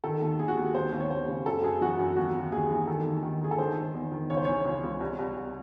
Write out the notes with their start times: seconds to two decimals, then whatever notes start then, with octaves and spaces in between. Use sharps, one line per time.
0.04 D#3 A4
0.22 D#2
0.39 D#2 G#4
0.48 F#4
0.57 D#2 G#4
0.75 D#2 C5
0.92 D#2
1.00 C#5
1.10 D#2 C5
1.28 C#3
1.46 F#2 A4
1.63 F#2 G#4
1.81 E3 F#4
1.99 F#2
2.16 D#2 F#4
2.35 D#2
2.52 D#2 G#4
2.71 E3
2.87 D#3 A4
3.06 D#2
3.23 D#3
3.41 D#3 G#4
3.51 A4
3.58 D#3 C5
3.77 D#3
3.94 E2
4.12 D#3
4.30 C#2 C#5
4.37 C5
4.45 E3 C#5
4.65 C#2
4.83 C#2
5.00 C2
5.19 C2
5.36 C2